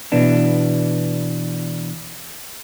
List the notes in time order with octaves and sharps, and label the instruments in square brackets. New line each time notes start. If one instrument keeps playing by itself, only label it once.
[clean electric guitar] B2 E3 B3 D4